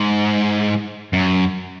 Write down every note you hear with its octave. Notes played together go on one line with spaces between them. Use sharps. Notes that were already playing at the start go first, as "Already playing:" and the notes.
Already playing: G#2
F#2